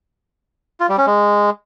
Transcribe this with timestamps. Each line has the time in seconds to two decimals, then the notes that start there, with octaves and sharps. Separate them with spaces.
0.80 F4
0.89 G3
0.98 C#4
1.07 G#3